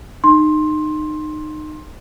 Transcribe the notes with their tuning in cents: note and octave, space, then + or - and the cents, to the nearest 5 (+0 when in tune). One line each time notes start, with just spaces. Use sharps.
D#4 -25 C6 +15